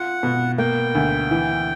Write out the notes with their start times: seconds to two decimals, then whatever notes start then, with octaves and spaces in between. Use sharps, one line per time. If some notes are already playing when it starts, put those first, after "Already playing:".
Already playing: F4 F#5
0.23 B2
0.58 A#3 G5
0.95 D2
1.31 E3